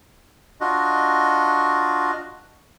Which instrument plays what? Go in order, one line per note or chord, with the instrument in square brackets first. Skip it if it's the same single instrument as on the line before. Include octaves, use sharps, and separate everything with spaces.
[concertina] D4 F4 F#4 D#5